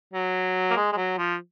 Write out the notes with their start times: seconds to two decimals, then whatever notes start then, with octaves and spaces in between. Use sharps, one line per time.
0.13 F#3
0.71 A#3
0.76 G#3
0.93 G#3
0.96 F#3
1.18 F3